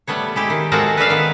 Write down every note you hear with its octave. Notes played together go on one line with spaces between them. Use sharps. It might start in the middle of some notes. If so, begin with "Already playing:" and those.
G3 A3 B3 C#5
G#3 E4 G4
D#3
G#3 C4 F#4 A4 A#4 F5
B4 D5 E5 F5
D#3 B3